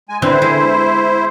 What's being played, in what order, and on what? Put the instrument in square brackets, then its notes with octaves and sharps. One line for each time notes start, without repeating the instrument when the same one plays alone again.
[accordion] G#3 G#5
[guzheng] D3 B3 C4 [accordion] E4 C5
[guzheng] G#3